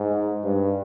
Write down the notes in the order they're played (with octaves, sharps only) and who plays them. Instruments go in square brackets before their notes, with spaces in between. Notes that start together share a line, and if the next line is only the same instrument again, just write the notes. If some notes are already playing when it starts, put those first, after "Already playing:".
Already playing: [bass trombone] G#2
G2